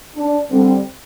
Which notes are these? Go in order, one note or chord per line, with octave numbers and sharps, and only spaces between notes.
D4
D3 G3 C4